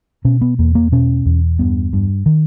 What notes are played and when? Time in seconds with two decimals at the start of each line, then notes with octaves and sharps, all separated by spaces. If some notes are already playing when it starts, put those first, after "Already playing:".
0.25 B2 C#4
0.41 B3
0.59 E2 A#3
0.75 A#3
0.92 B2 C#4
1.26 E2
1.59 G2 B3
1.93 G2
2.26 D#3